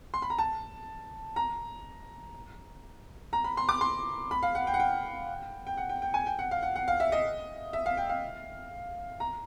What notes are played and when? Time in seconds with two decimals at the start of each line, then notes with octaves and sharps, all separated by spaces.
0.14 C6
0.22 B5
0.30 A#5
0.38 A5
1.36 A#5
3.33 A#5
3.44 B5
3.57 C6
3.69 D6
3.81 C6
4.31 B5
4.43 F5
4.55 F#5
4.67 G5
4.74 F#5
4.80 G5
5.67 G5
5.77 F#5
5.89 G5
6.02 G5
6.14 G#5
6.27 G5
6.39 F#5
6.51 F5
6.62 F#5
6.76 F#5
6.88 F5
7.00 E5
7.12 D#5
7.73 E5
7.86 F5
7.97 G5
8.09 F5
9.20 A#5